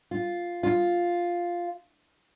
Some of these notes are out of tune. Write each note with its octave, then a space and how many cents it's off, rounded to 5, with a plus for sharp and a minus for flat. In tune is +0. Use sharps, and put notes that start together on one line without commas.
F4 +0
F4 +0